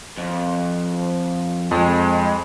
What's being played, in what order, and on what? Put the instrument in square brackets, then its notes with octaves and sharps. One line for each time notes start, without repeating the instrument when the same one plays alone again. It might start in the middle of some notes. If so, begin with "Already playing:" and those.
[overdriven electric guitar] F2
[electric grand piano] F2 [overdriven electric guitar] G#3